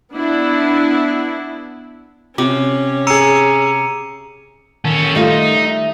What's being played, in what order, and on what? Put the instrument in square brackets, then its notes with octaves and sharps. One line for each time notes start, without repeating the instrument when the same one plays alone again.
[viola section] B3 D4 E4
[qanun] C3 [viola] C#4 [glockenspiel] D6
[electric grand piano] G#4 E6 [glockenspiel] A#5 C#7 D#7
[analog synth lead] D#3 [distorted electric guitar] C#4 A4
[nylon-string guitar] G3 A3 F4 [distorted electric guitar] D#4
[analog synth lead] E5